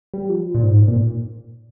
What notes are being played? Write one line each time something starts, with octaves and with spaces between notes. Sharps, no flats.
G3
F3
A#2
G#2
A#2